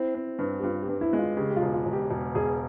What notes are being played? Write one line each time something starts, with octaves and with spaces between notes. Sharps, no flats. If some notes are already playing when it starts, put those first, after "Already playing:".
Already playing: C4 E4
C4
G2
G4
G2 F4
G4
G2
E4
G#3
F4
C#3 G4
G4
F4
E1
F4
E1
G4
E1
E1 G#4